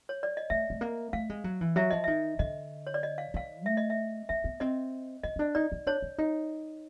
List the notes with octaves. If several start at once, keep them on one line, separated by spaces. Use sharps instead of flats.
C#5
D5
D#5
A3 E5
A3
A#3
A3 F5
G#3
F#3
E3
F#3 E5
F3 D#5
D#3 E5
D3 D#5
C#5
D5
D#5
F5
D#3 F5
A3 E5
D#5
E5
A#3 E5
B3
C4 D#5
C#4 D#5
C#4
D4
D#4 D5
D#4
D4 C#5
D4
D#4